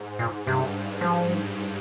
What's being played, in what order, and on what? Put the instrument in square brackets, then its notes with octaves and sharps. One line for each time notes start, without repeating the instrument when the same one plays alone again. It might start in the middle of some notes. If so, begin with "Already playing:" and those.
Already playing: [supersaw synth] G#2
[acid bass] A#2
[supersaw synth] G2 [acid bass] C3
[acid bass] F3